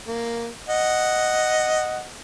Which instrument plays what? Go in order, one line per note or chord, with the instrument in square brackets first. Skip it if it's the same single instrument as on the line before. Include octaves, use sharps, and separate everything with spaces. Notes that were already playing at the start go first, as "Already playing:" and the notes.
[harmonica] A#3
D#5 F#5